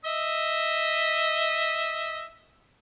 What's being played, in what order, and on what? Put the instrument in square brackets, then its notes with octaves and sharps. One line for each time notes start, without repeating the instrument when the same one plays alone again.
[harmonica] D#5 E5